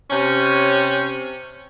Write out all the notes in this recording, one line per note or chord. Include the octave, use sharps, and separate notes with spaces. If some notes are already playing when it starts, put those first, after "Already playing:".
C3 C#4